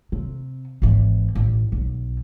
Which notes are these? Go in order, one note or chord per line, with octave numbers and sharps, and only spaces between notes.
C3
G#1 E3
A1
B1